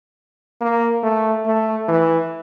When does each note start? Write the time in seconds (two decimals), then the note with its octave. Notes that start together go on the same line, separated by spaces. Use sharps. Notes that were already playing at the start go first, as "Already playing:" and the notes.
0.61 A#3
1.03 A3
1.46 A3
1.88 E3